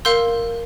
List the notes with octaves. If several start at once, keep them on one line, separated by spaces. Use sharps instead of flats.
A#4 F5 C6 E6 G6